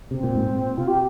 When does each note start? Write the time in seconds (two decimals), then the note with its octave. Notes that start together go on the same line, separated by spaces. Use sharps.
0.11 C3 C4
0.23 A#2
0.35 G#2
0.47 A#2
0.77 C3 F4
0.88 G4